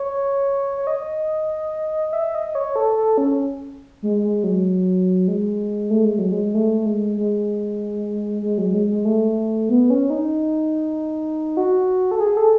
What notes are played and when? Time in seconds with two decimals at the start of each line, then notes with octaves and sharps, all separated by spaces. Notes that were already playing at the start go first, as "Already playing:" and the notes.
Already playing: C#5
0.77 C#5
0.87 D#5
2.13 E5
2.35 D#5
2.55 C#5
2.76 A4
2.97 A4
3.18 C#4
4.03 G#3
4.22 G#3
4.44 F#3
5.28 G#3
5.90 A3
6.05 G#3
6.18 F#3
6.32 G#3
6.54 A3
6.86 G#3
7.17 G#3
8.42 G#3
8.58 F#3
8.74 G#3
8.89 G#3
9.05 A3
9.69 B3
9.90 C#4
10.10 D#4
11.57 F#4
12.11 A4
12.20 G#4
12.37 A4